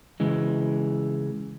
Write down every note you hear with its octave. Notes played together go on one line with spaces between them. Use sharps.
C#3 E3 G#3